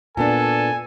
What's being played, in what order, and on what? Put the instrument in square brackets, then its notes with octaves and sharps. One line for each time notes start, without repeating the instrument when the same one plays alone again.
[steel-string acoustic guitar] A#2 B3 D4 [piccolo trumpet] A4 [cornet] G#5